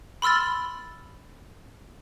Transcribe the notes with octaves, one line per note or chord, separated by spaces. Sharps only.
B5 C6 E6 F6 A6